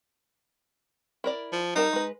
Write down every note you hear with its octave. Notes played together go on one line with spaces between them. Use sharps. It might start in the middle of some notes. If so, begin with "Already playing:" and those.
E4 A#4 D5
F3
G3 D#4 A#4 A5
G#3 B4